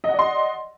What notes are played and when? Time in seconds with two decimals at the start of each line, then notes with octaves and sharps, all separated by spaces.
0.04 D#5
0.09 F#5
0.14 D5
0.19 C6